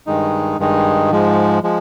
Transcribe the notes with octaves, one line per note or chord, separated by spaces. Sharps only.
G2 D#3 G#3 D#4
G2 D#3 G#3 D#4
G#2 F3 G#3
F3 G#3